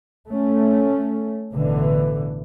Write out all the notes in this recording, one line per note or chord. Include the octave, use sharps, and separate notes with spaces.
A3 C#4
A1 B2 D3 E3